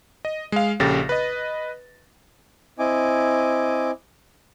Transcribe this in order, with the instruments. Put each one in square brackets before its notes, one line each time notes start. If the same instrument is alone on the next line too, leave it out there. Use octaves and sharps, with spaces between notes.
[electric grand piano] D#5
G#3 F5
A#1 C#3 G4 A4 A6 A#6
B4 D#5
[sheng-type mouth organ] C4 E4 D#5 G#5 D6